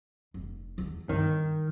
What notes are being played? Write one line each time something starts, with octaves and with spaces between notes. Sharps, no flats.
F1
E2
G2 D#3